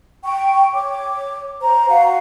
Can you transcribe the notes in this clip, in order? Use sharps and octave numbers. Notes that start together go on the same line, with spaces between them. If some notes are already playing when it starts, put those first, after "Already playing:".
G5 C#6
C#5 D6
C5 A#5
F#4 F5 F#5